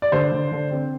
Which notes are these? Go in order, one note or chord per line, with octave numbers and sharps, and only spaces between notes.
D5
D3 C5
D3
D3
C4